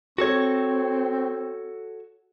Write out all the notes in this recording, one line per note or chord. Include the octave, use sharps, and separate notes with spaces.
C4 F#4 A4 C#5